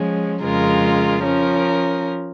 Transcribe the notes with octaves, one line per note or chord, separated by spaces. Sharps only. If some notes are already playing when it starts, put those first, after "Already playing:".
Already playing: F3 G#3 C#4
F2 C#3 G#3 F4 A#4
F3 C#4 A#4